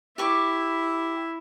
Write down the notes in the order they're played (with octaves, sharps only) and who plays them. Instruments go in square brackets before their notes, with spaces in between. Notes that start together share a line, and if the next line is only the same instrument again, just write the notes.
[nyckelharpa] E4 E5 [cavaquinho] G4 C#6 D6